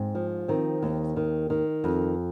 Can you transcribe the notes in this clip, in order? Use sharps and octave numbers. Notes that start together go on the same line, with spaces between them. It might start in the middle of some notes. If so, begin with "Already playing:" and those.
Already playing: G#2 C4
F3
D#3 C4
D#2
D#3
D#3
F2